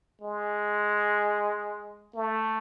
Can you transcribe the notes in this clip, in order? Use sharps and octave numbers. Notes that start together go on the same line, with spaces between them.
G#3
A3